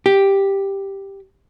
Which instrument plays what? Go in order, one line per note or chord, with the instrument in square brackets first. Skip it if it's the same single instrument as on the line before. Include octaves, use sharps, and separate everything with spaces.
[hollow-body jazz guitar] G4